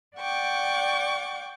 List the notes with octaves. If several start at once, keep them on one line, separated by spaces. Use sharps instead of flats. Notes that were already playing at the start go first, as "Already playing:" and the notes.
D5 F#5 G5 C#6 D6